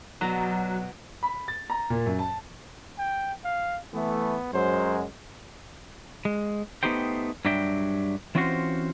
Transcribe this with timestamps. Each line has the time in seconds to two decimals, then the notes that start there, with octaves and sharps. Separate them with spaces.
0.21 B2 F#3 D5 A#5
1.23 B5
1.48 A6
1.70 A#5
1.90 A#2
2.06 F#2
2.19 A5
2.98 G5
3.44 F5
3.94 E3 A3 B3
4.53 F#2 F#3 G#3 C5
6.25 G#3
6.83 A3 B3 D#4 G4 C5 G5
7.45 G2 F#3 G3 D4 E5 G5
8.35 E3 C4 C#4 F4 F#4 C5